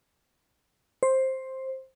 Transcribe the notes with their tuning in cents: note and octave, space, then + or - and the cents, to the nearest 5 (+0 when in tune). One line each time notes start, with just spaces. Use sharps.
C5 +10